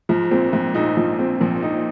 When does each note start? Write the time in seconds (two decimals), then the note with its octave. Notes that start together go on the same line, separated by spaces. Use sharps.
0.09 G#2 F3
0.31 A#1 A#2 C4
0.53 G#2 F3
0.75 A#1 A#2 D#4
0.97 G#2 F3
1.19 C4
1.40 A#1 A#2 F3
1.63 D#4